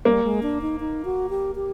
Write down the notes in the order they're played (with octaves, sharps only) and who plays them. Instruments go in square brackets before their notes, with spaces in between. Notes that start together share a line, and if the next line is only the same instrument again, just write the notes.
[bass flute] G3 [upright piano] A#3
[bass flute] G#3
D4
D#4
D#4
F#4
G4
G4